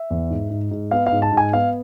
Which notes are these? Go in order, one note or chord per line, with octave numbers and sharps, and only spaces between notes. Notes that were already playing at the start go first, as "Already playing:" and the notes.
Already playing: E5
E2
G#2
G#2
G#2
B3 F5
F5
G#2
A5
G#2
G#5
B3 F5